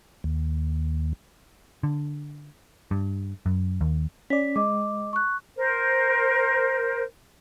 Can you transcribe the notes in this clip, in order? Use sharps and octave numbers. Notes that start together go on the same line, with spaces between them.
D#2
D3
G2
F#2
D#2
C#4 D5 B6
G#3 D#5 D6
C#6 F#6
A#4 C5